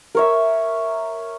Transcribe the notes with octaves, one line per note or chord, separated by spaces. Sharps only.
A#4 C#5 E5